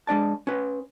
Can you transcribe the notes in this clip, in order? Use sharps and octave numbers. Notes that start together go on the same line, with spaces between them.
G#3 D4 D5 A5
C#4 B4